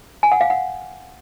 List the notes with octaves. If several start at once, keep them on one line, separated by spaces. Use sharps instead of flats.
G#5
F#5
F5
F#5